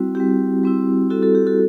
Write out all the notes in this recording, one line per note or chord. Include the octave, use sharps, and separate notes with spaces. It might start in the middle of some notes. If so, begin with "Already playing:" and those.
Already playing: G3 C4 E4 F#4
G3 C4 E4 G4
G3 C4 E4
G3 C4 E4 F#4 A4
F#4 A4
G4
F#4 A4